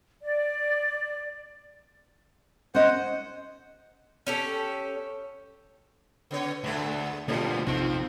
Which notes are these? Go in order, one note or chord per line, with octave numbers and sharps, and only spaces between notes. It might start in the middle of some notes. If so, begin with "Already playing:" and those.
D5
C#4 C5 D#5 F#5
C#4 G4 A4
C#3 B3 C#5
D2 G#3 B3 D4
D2 B2 F3 A#3 C4 G4 A4 D#5
A#1 C3 F3 C4 D#4 F4